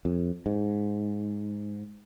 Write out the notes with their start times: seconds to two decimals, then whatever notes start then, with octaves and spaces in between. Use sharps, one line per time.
0.05 F2
0.46 G#2